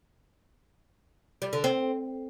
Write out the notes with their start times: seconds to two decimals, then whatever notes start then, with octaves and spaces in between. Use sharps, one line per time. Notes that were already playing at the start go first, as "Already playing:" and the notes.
1.42 G3
1.53 D3
1.64 C4